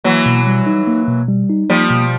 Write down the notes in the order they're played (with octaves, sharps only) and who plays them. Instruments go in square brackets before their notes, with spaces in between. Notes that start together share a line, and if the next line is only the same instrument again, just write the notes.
[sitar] E3 F#3 [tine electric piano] A#3
[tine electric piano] B2
G3
D#4
A#3
B2
G3
D#4
[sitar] F3 G3 [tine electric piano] A#3
[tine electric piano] B2